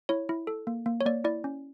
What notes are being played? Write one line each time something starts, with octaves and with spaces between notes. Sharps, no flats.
E4 C#5
E4
A4
A#3
A#3
C#5
A#3 D5
E4 D5
C#4